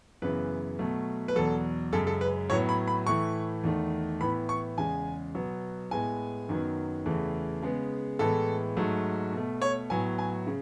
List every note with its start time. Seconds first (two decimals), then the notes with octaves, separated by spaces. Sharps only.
0.22 F#2 C#3 E3 B3 B4
0.79 B2 F#3 A3
1.28 B4
1.36 E2 B2 F#3 A4
1.93 F#2 C#3 G#3 A4
2.07 A4
2.21 B4
2.50 A2 F#3 B3 C#5
2.69 B5
2.88 B5
3.06 A2 E3 A3 C#6
3.64 E2 D#3 A3
4.20 A2 E3 B3 B5
4.49 C#6
4.78 E2 C#3 G#3 G#5
5.35 B2 F#3 B3
5.91 A2 G#3 B3 G#5
6.49 F#2 D#3 F#3 B3
7.06 E2 C#3 E3 A3
7.62 C#3 G#3 B3
8.19 A2 E3 G#3 B3 A4
8.76 G#2 F#3 A3
9.33 B2 A3
9.62 C#5
9.90 A2 F#3 B3 G#5
10.18 G#5
10.47 C#3